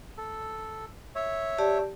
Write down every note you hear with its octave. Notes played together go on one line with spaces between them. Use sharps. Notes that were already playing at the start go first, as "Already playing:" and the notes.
A4
C#5 E5
G4 D5 A5